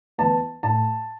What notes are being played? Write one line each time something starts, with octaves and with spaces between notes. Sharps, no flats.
E3 B3 A5
A2 A5